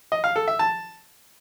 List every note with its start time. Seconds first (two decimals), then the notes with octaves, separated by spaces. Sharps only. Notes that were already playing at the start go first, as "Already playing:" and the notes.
0.12 D#5
0.24 F5
0.36 A4
0.48 E5
0.59 A5